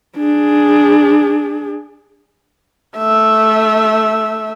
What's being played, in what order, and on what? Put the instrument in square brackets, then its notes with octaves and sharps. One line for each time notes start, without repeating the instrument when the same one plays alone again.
[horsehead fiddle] D4 G#4
A3 E5